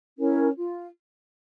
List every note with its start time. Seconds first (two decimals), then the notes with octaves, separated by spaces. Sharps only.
0.18 C#4 E4 A#4 C#5
0.56 F4